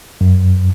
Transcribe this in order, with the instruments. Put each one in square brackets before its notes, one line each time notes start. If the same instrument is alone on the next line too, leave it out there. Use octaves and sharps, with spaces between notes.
[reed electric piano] F#2